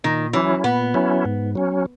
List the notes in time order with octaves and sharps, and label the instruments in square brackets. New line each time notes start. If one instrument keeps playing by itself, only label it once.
[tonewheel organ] A#2 [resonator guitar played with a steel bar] D#3
[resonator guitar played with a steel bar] E3 [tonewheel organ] F#3 C#4 E4
[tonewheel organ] A#2 [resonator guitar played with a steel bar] B3
[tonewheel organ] F#3 C#4 E4
G#2
F#3 C#4